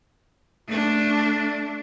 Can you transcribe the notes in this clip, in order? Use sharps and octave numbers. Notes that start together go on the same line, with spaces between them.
A3 D4